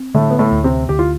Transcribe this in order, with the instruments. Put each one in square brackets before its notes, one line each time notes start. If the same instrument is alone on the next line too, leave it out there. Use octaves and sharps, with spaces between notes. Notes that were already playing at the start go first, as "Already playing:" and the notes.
Already playing: [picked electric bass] C4
[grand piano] A2 A3 [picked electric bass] D3
[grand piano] B3
A2 A3
[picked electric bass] D2
[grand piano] C3 C4
[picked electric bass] D2 [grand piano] G4
[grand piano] F4